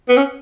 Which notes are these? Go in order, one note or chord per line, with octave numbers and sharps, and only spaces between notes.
B3
C#4